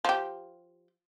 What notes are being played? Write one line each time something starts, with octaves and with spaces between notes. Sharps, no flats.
F3 G4